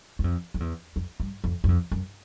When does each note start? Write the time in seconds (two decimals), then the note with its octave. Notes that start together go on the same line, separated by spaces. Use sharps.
0.19 F#2
0.24 F2
0.54 F2
0.60 E2
0.96 F2
1.20 G2
1.44 F2
1.64 F#2
1.69 F2
1.92 F#2